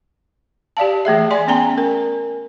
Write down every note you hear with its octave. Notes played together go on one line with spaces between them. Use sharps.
G4 D5 F5 A5
E3 A3 G#4 E5
D5 G#5 C6
B3 C#4 G5 G#5 A#5
A#4